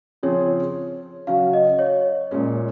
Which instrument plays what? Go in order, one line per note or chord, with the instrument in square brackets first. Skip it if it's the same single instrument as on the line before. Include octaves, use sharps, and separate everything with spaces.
[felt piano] C#3 F3 C4 F4 G#4 [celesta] C#5
[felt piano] C#3 F#3 C#4 F#4 [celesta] F5
[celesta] D#5
C#5
[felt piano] A#2 G#3 C#4